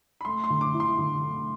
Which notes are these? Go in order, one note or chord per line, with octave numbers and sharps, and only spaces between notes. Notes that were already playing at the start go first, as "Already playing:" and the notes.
B5
A3 C6
C6
D3
D6
E4
C6
D3
A3